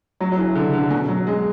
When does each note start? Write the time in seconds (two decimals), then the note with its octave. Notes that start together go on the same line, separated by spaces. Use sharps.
0.21 F#3
0.32 F#3
0.38 E3
0.55 D3
0.73 D3
0.91 B2
1.08 F#3
1.27 G#3